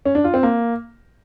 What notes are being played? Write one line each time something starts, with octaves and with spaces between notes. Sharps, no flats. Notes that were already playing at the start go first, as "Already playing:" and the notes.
C#4
D4
F4
C4
A#3